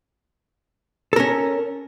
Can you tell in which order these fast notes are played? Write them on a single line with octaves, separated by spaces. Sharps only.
A4 A#4 C#4